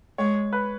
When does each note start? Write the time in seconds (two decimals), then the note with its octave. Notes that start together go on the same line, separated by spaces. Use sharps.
0.18 G#3 C#5
0.53 B4